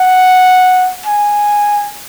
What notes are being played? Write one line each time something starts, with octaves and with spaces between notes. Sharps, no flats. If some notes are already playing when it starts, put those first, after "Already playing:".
Already playing: F#5
G#5